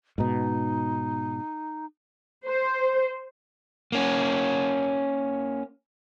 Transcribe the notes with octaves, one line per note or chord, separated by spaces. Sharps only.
G#2 B2 D#4
C5
A#3 C#4